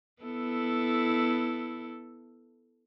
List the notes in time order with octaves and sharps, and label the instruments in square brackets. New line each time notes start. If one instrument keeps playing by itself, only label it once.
[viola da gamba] B3 E4 A4